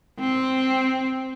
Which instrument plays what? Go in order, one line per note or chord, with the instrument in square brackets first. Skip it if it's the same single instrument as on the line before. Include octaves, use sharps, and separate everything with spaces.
[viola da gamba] C4